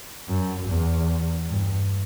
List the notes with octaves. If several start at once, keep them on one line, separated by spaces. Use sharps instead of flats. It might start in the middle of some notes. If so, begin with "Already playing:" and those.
F#2
E2
G2